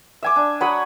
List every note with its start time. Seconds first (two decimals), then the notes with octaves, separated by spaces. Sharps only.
0.23 E5 G#5 D6
0.36 D4
0.61 F#3 C#5 B5 D#6